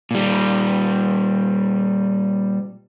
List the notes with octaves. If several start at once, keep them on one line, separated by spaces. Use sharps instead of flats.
A#2 G3